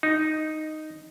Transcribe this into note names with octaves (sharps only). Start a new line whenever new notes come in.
D#4